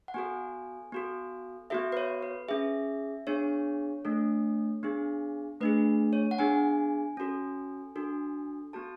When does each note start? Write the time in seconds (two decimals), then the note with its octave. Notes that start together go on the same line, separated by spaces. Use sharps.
0.08 F#5
0.14 B3 F#4 A4 G#5
0.92 B3 F#4 A4
1.70 B3 F#4 A4 E5
1.92 B4
1.97 C#5
2.22 B4
2.49 C#4 G#4 E5
3.27 B3 D4 G#4 C#5
4.05 A3 D4 A4
4.83 B3 D4 G#4
5.61 A3 D4 G#4 B4
6.13 C#5
6.31 F#5
6.39 B3 D4 G#4 G#5
7.17 C#4 F#4 A4
7.96 D4 F#4 A4
8.73 B3 F#4 A4 A5